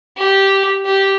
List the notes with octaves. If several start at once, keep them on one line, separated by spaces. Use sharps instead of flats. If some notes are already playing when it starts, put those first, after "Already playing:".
G4
G4